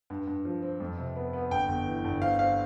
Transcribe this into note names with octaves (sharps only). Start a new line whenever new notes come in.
G2
G2
F3
C4
F2
C3
B3
B3
G1 G5
G1
E3
G1
C4 F5
C4 F5